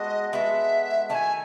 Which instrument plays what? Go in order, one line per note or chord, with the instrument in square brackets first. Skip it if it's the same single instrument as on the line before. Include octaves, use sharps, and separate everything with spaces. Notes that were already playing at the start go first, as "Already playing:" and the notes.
Already playing: [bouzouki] G#3 B3 F#4 A4 [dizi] D#5
[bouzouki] G#3 B3 F#4 A4 [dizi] E5
[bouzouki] D#3 A3 E4 [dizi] G#5 A5